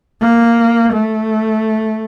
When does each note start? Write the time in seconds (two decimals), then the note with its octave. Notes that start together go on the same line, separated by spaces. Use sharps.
0.22 A#3
0.93 A3